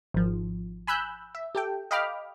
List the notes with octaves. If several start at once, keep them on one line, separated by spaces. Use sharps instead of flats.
G#1 F3
G#5 B5 E6 F#6 G6
E5
G4 A4 G5
D#5 F5 G5 B5 D6 F6